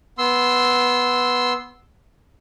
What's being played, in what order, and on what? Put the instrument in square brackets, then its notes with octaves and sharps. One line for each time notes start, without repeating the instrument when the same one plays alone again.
[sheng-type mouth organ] B3 C6 E6